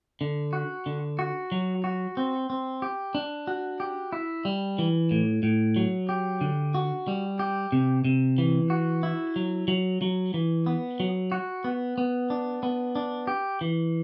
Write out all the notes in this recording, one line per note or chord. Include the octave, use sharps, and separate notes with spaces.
D3
F#4
D3
F#4
F#3
F#4
C4
C4
G4
D4
F#4
G4
E4
G3
E3
A2
A2
F#3
G4
D3
F#4
G3
G4
C3
C3
E3
F#4
E4
F#3
F#3
F#3
E3
B3
F#3
F#4
B3
B3
D4
B3
D4
G4
E3